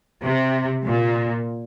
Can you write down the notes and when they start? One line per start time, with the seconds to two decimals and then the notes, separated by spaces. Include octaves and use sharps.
0.23 C3
0.85 A#2